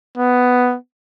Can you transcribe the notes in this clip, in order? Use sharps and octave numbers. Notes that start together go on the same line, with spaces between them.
B3